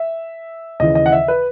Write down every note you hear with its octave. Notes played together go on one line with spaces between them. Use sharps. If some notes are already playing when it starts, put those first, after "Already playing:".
Already playing: E5
D#2 C#3 E3 D#5
D#5
F#5
E5
B4